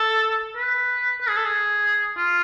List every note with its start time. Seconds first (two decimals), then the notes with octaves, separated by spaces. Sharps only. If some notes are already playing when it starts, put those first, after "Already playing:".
Already playing: A4
0.56 B4
1.21 B4
1.29 G#4
1.37 A4
1.45 G#4
2.17 F4